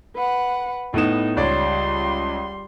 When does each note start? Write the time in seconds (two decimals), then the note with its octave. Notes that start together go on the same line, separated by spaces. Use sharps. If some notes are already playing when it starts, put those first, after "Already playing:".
0.16 B4 F#5
0.94 A2 B3 D#4 E7
1.37 C#2 G3 C#5 D5 C6